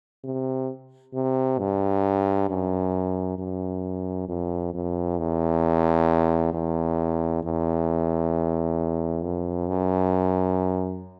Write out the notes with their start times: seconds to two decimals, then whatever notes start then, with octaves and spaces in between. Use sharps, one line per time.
0.24 C3
1.14 C3
1.59 G2
2.49 F#2
3.38 F#2
4.29 F2
4.74 F2
5.18 E2
6.53 E2
7.44 E2
9.23 F2
9.68 F#2